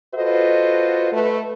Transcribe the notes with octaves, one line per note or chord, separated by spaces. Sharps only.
F4 F#4 A4 B4 C5 D#5
A3 B4